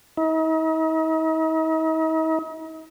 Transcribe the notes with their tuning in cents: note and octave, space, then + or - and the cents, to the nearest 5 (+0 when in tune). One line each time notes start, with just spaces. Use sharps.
D#4 +45